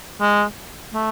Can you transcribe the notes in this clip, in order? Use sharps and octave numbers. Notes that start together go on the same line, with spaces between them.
G#3
A3